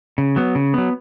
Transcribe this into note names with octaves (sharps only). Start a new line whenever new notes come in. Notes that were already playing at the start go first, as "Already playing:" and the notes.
C#3
F#3 B3
C#3
F#3 B3